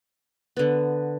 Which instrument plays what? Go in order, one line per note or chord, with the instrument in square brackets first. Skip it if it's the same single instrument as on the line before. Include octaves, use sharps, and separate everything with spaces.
[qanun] D3 B3